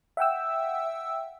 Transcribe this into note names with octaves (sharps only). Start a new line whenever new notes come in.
E5 F#5 G5 E6